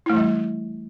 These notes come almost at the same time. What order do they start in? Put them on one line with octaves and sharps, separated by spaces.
E4 A3 E3 G3